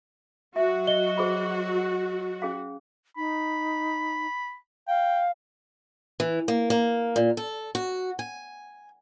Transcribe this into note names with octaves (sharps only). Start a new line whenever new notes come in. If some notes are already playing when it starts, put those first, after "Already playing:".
F#3 F#4 E5
D#5 G7
G#4 C5 B5
C#4 G#4 F5
D#4 B5
F5 G5
E3
A#3
A#3
A#2
A4
F#4
G#5